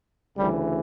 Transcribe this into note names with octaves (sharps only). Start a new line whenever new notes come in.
D2 C#3 E3 G3